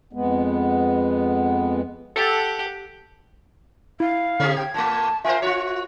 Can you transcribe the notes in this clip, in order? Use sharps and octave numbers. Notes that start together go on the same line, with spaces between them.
F2 G#3 B3
G4 A4 F#5
E4 F5
D3 C4 G4
G5 G#6
A#2 A3 A5
F4 A#4 C5 E5 G#5
F4 F#4 C#5